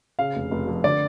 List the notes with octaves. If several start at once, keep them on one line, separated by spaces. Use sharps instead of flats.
C#3 F5
F1
F1
F2
D3 D5